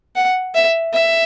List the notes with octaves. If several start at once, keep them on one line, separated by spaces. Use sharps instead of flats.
F#5
E5
E5